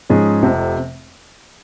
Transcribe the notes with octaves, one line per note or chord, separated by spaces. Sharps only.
G#2 F3 G#3 C#4 G#4
F1 F2 C3 F3